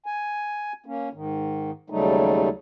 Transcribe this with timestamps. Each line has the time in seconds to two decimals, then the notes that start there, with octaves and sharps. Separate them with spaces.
0.06 G#5
0.86 A#3 C#4
1.13 G#2 D#3
1.90 D#2 C#3 F#3 G3 A3 D#4